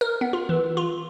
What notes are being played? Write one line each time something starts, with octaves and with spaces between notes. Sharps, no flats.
A#4
B3
F4
E3
F4